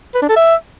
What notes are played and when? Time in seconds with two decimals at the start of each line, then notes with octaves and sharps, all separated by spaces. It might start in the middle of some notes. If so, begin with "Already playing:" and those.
0.14 B4
0.22 D4
0.29 A4
0.36 E5